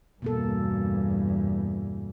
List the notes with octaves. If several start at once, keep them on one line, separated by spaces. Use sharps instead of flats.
E2 G2 B2 A#3 A4